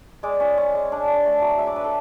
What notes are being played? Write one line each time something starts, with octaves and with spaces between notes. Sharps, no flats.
G#3 D5
C#4
C#4
G#3
D4
D4
A3
F#3
G#3 E5
D5
D4 B4
A4